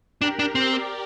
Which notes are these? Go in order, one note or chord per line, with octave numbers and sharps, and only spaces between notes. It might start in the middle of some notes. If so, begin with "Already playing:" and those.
D4 G4 A#4
D4
C4
A#4 D5